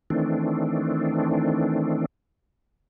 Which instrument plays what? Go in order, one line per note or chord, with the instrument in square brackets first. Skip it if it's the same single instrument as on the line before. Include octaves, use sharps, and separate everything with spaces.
[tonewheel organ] D#3 E3 A3 C4 D4